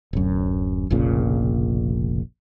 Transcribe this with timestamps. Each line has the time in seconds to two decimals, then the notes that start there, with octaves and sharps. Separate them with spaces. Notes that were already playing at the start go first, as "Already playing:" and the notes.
0.13 D1 F#2
0.90 F1 A#1 A#2 C#3